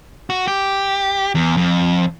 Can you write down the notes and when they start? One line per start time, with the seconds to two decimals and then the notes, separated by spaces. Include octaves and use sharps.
0.30 F#4
0.48 G4
1.35 E2
1.57 F2